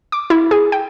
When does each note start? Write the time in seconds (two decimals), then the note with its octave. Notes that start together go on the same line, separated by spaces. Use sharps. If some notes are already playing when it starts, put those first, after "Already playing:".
0.12 D6
0.30 E4
0.51 G#4
0.72 G5